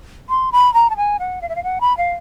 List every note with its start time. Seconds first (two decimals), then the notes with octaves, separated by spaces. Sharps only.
0.29 C6
0.52 B5
0.74 A#5
0.90 A5
0.97 G#5
1.19 F#5
1.41 F5
1.49 E5
1.56 F5
1.64 F#5
1.81 B5
1.97 F5